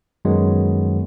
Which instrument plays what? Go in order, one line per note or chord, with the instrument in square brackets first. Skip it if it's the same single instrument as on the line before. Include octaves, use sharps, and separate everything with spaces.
[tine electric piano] F#2 D#3 F#3 G#3 B3